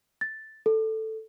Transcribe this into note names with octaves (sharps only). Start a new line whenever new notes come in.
A6
A4